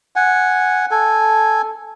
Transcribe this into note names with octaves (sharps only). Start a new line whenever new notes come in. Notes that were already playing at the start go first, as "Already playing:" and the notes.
F#5 G#5
A4 G#5